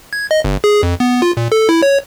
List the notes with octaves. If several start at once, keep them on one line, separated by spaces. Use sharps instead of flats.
G#6
D#5
G1
G#4
F2
B3
F4
A#2
A4
E4
C#5